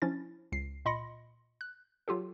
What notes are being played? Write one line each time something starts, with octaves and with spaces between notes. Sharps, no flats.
F3 C#4 D4 E4 A6
C#2 C7
A#2 D#5 B5 C6 A#6 C#7
F#6
F#3 F4 G4 A4